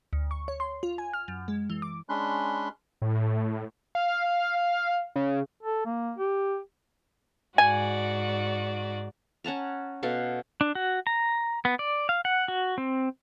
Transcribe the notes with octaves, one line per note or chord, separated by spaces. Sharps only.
D2
C#6
C#5
C6
F4
G#5
F6
F#2
G#3
E3
D6
G#3 C#4 D4 B5 C6 F#6
A2
F5
C#3
A4
A#3
G4
G#2 F#4 D5 G#5
C#4 F#5 A5 A#5
B2 A4 F5 F#5
D4
F#4
A#5
B3
D5
F5
F#5
F#4
C4